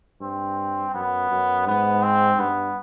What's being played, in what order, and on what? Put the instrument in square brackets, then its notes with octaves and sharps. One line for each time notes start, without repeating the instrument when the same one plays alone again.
[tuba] G2 [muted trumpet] C4
[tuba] F#2 [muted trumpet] B3
[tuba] F#2
[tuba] G#2 [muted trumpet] B3
[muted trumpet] C4
[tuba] G2 [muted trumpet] B3